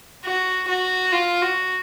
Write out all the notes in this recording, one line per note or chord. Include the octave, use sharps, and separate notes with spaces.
F#4
F#4
F4
F#4